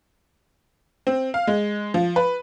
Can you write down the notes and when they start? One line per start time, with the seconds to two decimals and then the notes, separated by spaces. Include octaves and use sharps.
1.07 C4
1.34 F5
1.47 G#3
1.94 F3
2.16 B4